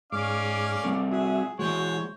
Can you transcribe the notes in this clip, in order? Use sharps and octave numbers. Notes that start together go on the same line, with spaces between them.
G#2 C#4 D5 F5 D6
G3 C4 A4
F#4 G#4 E5
E3 G#3 F#4 C5 C#5